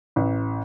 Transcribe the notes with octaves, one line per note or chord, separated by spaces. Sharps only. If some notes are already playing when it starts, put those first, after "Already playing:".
A1